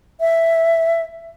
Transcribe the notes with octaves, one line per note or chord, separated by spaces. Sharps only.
E5